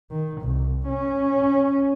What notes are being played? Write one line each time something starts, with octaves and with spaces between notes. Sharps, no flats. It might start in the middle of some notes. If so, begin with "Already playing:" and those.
D#3
C2
C#4